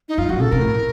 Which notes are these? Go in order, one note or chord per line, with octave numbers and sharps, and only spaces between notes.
D#4
F#2 F4
F#2 F#4
C#3 A4
C3 A#4
A2